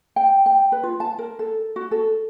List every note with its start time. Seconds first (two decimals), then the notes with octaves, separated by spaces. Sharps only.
0.16 G5
0.46 G5
0.72 B4
0.83 F4
1.00 A5
1.19 A#4
1.39 A4
1.76 F#4
1.91 A4